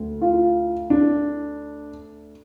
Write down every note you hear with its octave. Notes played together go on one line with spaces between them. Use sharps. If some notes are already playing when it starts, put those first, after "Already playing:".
Already playing: D2
F4
D4